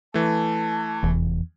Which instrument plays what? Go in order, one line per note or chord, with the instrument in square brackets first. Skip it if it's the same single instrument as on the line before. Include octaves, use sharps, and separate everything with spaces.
[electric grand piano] E3 A3 [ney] A5
[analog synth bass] F1 [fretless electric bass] E2